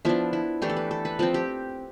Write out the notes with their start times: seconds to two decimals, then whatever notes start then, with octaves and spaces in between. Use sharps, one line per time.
0.05 F3 B3 D4 E4
0.33 E4
0.62 E3 A3 D4 G4
0.69 A4
0.76 B4
0.91 A4
1.05 B4
1.19 F3 C4 B4
1.34 G4